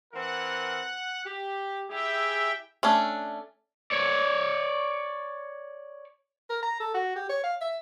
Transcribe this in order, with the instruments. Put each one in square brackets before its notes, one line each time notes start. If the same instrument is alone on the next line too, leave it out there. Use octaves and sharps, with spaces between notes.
[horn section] E3 C4 A#4 [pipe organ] F#5
[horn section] G4
[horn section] E4 G4 G#4 [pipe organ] E5 G5
[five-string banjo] A3 C#4 D4
[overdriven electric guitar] C#5 D5
[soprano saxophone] A#4
A#5
A4
F#4
G4
C#5
F5
E5